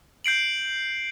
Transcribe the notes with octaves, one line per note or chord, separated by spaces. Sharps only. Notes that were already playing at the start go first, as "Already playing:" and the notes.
G6 C7 D7 F#7